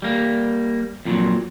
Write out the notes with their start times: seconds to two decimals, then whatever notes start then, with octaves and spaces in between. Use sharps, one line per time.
0.02 G3 A#3
1.05 F2 A#2 E3 F#3